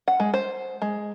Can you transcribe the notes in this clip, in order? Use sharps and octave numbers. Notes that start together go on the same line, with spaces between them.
F#5
G#3
C5
G#3